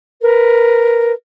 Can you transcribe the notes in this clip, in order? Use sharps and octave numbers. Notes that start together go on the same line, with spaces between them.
A#4 B4